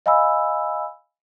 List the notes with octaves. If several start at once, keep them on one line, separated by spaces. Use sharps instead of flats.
D#5 F5 G#5 B5 E6